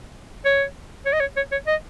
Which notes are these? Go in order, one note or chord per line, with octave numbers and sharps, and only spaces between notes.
C#5
C#5
D#5
C#5
C#5
C#5
D#5